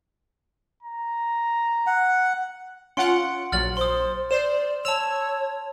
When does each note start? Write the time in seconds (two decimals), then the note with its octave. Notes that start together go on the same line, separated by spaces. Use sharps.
0.83 A#5
1.87 F#5
2.97 C#4 F4 F#5 C6 C#7 D7
3.52 A#1 F#3 F6 A6 F#7
3.77 C5 C6 D#6
4.31 C5 D5 E7
4.85 C#5 A5 E6 F7